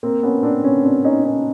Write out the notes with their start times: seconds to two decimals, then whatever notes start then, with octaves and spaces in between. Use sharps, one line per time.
0.03 A#3 C4
0.23 B3 C#4
0.43 C4 D4
0.63 B3 C#4
0.83 C4 D4
1.04 C#4 D#4
1.24 C#4 D#4